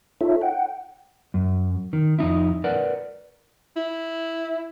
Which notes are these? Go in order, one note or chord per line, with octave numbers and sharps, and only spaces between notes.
D#4 F4 A4 C#5 E5
F#5 G5
F#2
D#3
F2 D#4 E4
A#4 B4 D5 F#5
E4